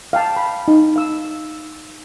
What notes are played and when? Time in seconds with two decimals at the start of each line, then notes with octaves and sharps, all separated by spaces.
0.13 F5 G5 A5
0.37 B5
0.68 D#4
0.96 F5 E6